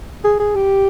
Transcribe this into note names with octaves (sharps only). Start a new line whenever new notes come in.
G#4
G#4
G4